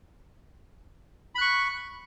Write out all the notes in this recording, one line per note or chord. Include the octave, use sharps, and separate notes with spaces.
B5 C#6 F#6